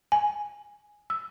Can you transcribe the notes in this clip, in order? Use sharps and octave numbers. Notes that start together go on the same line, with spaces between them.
G#5
E6